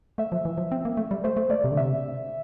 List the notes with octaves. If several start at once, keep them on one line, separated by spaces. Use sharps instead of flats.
A3 E5
F3
E3
F3
C4
A#3
A3
G3
A3 C5
A3
A3 D5
C3
D3
C3 E5